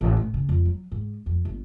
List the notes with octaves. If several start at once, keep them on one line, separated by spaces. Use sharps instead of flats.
A1
A2
C#3
F2
F#3
G#2
F2
G1